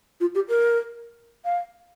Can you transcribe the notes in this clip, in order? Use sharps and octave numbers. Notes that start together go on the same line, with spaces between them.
F4
G4
A#4
F5